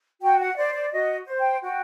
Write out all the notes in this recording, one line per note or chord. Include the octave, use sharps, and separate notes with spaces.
F#4 G5
F#5
C5 D5
D5
F#4 D#5
C5
G5
F#4 G5